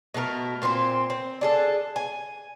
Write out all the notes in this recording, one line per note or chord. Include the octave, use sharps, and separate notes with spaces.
B2 A3 A4 A#4
A#2 C4 G4 C5
C4
D4 G#4 A4
G#5